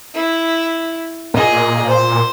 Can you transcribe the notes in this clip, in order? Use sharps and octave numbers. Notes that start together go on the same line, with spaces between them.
E4
A#2 G#4 D#5
C5